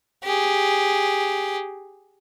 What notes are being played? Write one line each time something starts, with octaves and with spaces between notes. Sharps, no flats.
G4 G#4